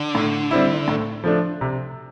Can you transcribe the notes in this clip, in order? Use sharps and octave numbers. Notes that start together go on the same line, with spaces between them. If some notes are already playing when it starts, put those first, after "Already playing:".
Already playing: D3
A2
G3 C4 E4
A2
F3 A3 D4
C3